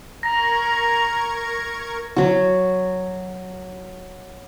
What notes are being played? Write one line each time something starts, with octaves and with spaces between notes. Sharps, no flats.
A#4 A#5 C#6 G#6 A#6
F#3 F#4